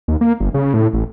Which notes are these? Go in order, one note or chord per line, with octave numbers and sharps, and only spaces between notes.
D#2
A#3
G1
C#3
A2
A1